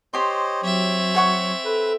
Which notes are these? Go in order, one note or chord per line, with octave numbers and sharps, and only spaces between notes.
G4 C5 C#5 D#5 C6
F#3 C4 C#5 E5
G#4 F#5 C#6
A4 B4